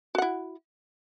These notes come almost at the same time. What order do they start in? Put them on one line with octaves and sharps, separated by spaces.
F#4 F#5 E4